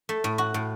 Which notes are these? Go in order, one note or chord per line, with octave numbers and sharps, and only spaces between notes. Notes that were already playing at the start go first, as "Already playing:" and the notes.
A3
A2
F#4
A2